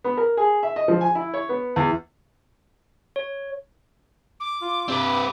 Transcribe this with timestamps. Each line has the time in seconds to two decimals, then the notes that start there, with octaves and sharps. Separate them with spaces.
0.04 B3
0.17 A#4
0.37 G#4
0.63 E5
0.76 D#5
0.88 F3
1.01 G#5
1.15 E4
1.34 C#5
1.49 B3
1.76 E2
3.16 C#5
4.40 D6
4.61 F4
4.88 G2 C3 C4 B4